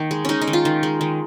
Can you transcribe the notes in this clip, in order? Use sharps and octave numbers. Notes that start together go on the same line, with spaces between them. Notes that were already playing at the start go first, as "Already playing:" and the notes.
Already playing: D#3 A#3
G#3
G#3 C#4 D#4
D#4
D#3
F4
D#3
G#3
D#3